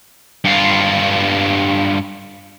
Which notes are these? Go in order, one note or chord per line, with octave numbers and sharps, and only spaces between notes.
G2 F4